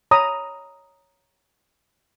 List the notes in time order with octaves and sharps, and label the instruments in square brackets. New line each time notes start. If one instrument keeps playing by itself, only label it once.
[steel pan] C#5 A#5 B5 D#6